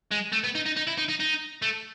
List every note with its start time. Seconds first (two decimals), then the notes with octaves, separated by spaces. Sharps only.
0.12 G#3
0.33 A3
0.44 B3
0.55 D#4
0.66 D#4
0.76 D#4
0.87 E4
0.98 D#4
1.09 D#4
1.20 D#4
1.62 A3